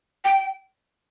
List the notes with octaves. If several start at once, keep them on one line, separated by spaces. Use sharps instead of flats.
G5